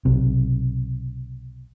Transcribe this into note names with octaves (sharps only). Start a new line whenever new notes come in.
B1 C3